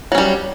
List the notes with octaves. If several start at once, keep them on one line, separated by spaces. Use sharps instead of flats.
F#3 G3 C#4